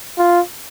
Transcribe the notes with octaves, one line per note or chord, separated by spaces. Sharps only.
F4